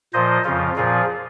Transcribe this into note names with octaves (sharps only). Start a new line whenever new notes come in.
A#2 F3 C5 D#5
F2 C#3 F3 F4
A#2 F3 F4 G#4